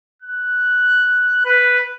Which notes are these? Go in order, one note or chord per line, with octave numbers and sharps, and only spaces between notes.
F#6
B4